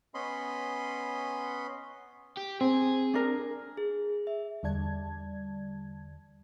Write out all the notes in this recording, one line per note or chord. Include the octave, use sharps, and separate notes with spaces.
B3 C#4 D#5 B5 C6
G4
C4 G#4
D4 A#4
G#4
E5
E2 D3 G3 D5 A5 G#6